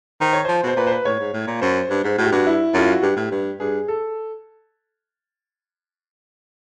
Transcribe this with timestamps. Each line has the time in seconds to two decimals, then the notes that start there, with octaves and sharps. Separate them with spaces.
0.21 D#3 C5
0.33 C#5
0.45 F3 C5
0.63 B2 C5
0.77 A#2 B4
0.87 C5
0.92 B4
1.05 A2 C#5
1.20 G#2
1.34 A2
1.47 A#2
1.61 F#2 C5
1.90 G2
2.04 G#2
2.18 A2 F#4
2.25 G4
2.32 G2 F#4
2.47 E4
2.74 F#2 F4
2.91 F#4
3.02 G2 G4
3.17 A2
3.31 G2
3.60 G2 G#4
3.88 A4